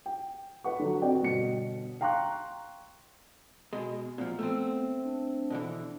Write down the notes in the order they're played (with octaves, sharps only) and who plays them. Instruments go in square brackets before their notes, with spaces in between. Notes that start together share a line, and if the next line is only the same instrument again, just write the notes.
[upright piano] G5
B4 F#5 C#6
D3 F#3
C4 F#4 B4 D5 D#5 G5
G1 B2 C#7
F5 G5 A#5 C6 C#6 F#6
[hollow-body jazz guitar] B2 G#3
[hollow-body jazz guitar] A#2 F3 [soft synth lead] B3
[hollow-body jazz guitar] A3 C4
[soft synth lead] D4
[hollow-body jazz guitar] B2 D3 E3